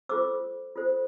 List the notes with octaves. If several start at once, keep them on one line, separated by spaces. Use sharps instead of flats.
F4 A4 C5 D6 E6
F4 A4 C5